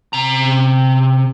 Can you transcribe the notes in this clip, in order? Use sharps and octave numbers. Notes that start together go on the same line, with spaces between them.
C3 A#5